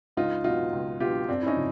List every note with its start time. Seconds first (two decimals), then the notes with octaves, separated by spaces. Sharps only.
0.17 C#2 D#4 F4
0.44 B2 F#3 D#4 F4
0.73 C#2
1.00 B2 F#3 F4 G4
1.29 F#2 C4 D4
1.43 E4
1.47 C#4 D#4
1.56 C#3 F3